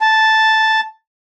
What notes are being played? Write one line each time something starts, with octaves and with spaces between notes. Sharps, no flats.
A5